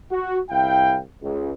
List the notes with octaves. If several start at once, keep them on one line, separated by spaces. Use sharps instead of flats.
F#4
C2 E4 F5 G5
C#2